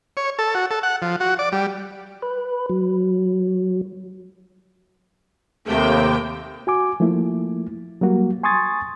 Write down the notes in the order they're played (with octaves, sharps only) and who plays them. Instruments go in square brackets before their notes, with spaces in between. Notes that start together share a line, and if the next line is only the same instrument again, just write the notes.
[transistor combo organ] C#5
A4
F#4
A4
F#5
F3
F#4
D5
G3
[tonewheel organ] B4
F#3
[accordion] D#2 C3 [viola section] A3 A#3 G5
[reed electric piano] F#4 G#5 D6
F3 A3 A#3 E4
F#3 G3 A#3 F#4
G#5 C6 C#6 D#6 G#6 A6